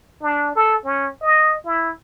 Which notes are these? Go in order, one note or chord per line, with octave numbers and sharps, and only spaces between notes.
D4
A4
C#4
D#5
E4